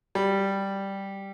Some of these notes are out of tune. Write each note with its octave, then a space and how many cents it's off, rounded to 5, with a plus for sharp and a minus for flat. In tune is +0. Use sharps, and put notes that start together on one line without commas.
G3 +0